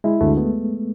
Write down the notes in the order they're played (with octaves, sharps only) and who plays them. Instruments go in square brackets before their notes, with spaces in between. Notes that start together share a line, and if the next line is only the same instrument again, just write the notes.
[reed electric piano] G#3 [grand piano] E4
[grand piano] D2 [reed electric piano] A3
[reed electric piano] B3